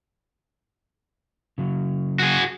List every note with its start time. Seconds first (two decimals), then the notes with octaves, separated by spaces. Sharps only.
1.58 C#3 F#3
2.19 F#4 G#4